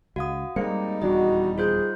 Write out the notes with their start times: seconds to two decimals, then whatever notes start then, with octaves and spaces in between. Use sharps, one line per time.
0.16 C#2 F#4 F5 D#6
0.56 G3 G#3 A#3 C4 D#4 C#7
1.02 D#1 E2 D4 F#4 D#5
1.58 F4 G#4 C5 G6